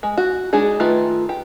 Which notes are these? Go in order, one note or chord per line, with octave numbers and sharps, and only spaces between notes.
G#3
F#4
G#3 D4 D#4 G#4
D#3 A3 F4 A4 B4
G4